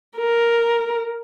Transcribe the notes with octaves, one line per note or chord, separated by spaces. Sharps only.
A#4